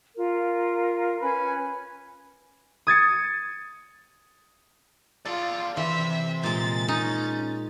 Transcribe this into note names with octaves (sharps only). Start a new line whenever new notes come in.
F4 A#4
C#4 B4 G#5 B5
D#6 G#6 A6 C#7
F4 G#4 A4 D5
C3 E3 E5 C6
A#2 G#3 A6
C#4 D#4